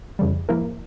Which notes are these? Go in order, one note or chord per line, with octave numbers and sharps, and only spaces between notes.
F2 C#3 E3 G3
G#2 F3 A#3 E4 A#4